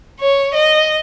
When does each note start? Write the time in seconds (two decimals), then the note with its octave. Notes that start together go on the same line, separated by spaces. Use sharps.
0.20 C#5
0.55 D#5